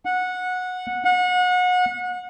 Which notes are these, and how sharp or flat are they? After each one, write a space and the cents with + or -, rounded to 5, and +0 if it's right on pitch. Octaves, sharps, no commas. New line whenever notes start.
F#5 -15
F#5 -30